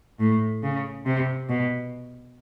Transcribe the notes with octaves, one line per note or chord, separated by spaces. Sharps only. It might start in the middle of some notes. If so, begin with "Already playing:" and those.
A2
C#3
C3
B2